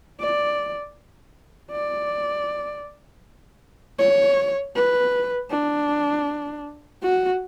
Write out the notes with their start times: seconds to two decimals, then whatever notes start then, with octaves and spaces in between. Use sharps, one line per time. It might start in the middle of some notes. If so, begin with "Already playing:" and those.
0.20 D5
1.71 D5
3.99 C#5
4.75 B4
5.50 D4
7.02 F#4